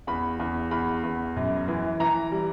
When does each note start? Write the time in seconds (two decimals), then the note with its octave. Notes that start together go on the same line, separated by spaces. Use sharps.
0.07 E2 B5
0.39 E2
0.71 E2 B5
1.03 E2
1.36 F#2
1.68 E3
2.00 E3 A#5
2.32 G3